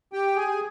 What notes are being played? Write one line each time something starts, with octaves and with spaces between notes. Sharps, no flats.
G4 G5
G#4 G#5